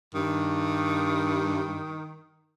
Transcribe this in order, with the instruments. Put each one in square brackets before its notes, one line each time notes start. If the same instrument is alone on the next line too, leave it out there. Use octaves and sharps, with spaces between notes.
[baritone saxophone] G2 [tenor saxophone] D#3